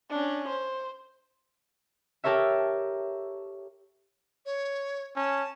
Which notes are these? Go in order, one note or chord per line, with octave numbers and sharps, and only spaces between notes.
C#4 D4
C5
G4 A4 A#4 C#5 E5
C#5
C#4 A5